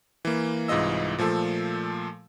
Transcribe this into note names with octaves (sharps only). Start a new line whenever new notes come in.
E3 A#3
C2 G#2 E3 F4 D#5 E6
A#2 F3 A3 A4